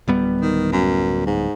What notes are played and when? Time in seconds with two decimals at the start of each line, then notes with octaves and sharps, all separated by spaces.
0.08 D1 G3 B3
0.41 D#3
0.72 F#2
1.26 G#2